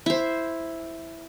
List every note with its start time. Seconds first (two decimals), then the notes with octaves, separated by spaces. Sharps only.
0.06 E4 C5